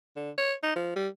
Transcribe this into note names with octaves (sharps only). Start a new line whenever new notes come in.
D3
C#5
D#4
F3
G3